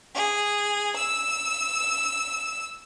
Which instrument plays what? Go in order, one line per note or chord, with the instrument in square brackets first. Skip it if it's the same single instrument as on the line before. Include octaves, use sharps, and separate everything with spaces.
[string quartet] G#4
E6